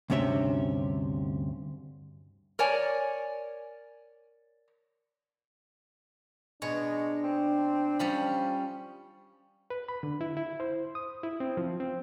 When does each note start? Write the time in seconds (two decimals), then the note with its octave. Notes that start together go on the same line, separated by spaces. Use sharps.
0.10 D2 G2 C3 C#4 E5
2.59 A#4 C#5 D5 G#5
6.62 B2 G#3 D4 C#5
7.24 C4
7.99 F3 G3 C#4 B5
9.70 B4
9.88 B5
10.03 D3
10.21 E4
10.37 E4
10.60 C5
10.95 D#6
11.23 E4
11.40 C4
11.57 F3
11.80 C4